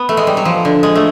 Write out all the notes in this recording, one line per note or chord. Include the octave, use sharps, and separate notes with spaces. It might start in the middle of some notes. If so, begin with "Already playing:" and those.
Already playing: B3
A3
G#3
G3
F#3
F3
D3
G#3
A3